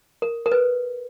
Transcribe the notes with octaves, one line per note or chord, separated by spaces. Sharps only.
A#4
A#4
B4